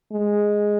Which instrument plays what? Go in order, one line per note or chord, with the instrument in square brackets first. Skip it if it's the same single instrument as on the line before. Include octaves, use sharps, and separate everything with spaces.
[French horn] G#3